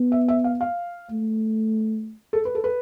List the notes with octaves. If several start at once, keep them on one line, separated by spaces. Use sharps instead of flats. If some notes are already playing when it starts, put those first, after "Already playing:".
Already playing: B3
E5
E5
F5
F5
A3
A4
B4
A4
B4